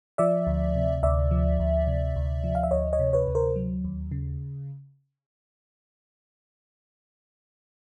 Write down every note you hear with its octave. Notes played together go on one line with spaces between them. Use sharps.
F3 D5 E5
D2
C3
D2 D5 E5
F3
D2
C3
D2
F3
F5
E5
D2 C#5 D#5
C#5 D#5
C3
B4 C#5
D2
A#4 C5
F#3
D#2
C#3